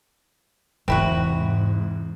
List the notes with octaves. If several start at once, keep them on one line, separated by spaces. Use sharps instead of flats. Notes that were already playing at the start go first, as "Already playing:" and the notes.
E2 G#2 C3 C4 E4 F#4